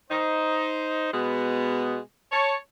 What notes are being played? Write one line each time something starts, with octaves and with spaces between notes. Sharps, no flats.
D#4 C5
B2 G#3 B3
C#5 A5